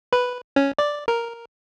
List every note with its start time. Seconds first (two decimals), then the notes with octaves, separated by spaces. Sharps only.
0.13 B4
0.56 C#4
0.78 D5
1.08 A#4